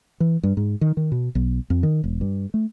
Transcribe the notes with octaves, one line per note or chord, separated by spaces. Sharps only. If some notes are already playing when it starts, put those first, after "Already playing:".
E3
G2
G#2
D#3
D#3
B2
B1
F2
D#3
E1
G2
A3